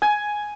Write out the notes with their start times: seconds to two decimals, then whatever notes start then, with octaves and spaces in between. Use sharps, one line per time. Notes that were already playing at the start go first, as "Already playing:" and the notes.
0.02 G#5